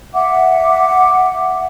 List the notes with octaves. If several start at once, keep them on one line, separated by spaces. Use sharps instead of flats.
E5 F#5 D6